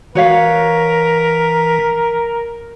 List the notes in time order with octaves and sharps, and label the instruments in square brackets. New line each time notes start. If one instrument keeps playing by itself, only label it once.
[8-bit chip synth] E3 B6 [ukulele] F#4 C#5 F5 [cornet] A#4